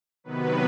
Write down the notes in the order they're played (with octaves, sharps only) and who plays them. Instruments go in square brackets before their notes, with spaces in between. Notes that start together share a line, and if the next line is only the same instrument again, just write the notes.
[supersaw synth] C3 D#3 F#3 B3 B4